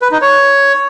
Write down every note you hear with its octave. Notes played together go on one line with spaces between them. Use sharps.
B4
D#4
C#5